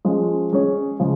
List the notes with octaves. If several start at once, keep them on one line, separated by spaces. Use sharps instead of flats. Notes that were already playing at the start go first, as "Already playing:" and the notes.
F3 G#3 C#4
G#3 C#4 G#4 C#5
C#3 F3 G#3